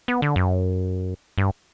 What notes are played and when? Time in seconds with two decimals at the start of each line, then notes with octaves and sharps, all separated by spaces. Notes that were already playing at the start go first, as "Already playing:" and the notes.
0.08 B3
0.22 D3
0.36 F#2
1.38 G2